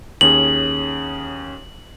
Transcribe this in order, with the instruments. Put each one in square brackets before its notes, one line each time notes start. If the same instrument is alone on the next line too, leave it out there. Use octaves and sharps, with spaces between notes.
[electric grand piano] D#2 C#4 G#4 [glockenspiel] F#7